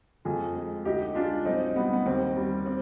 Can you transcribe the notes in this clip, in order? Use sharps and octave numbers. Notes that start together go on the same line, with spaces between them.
F2 F4 G#4
G#3
D2 D#4 G4
G#3 D4 F4
B1 C4 D#4
G3 B3
B3
D#2 C4
G3
C4